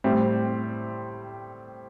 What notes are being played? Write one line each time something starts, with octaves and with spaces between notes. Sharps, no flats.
A2 G3 C4